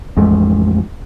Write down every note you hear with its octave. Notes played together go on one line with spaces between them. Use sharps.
A1 F2 G#3 A3